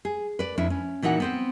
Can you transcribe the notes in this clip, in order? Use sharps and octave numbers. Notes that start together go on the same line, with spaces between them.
G#4
B4 D5
F2 D4 E4
C#4
A#2 E3 D#4 F#4 F#5
B3 C4 C5